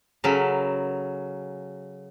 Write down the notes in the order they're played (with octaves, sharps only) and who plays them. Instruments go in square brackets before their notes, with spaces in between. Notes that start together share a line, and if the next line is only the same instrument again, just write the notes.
[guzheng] C#3 F#3 A4 A#4 B5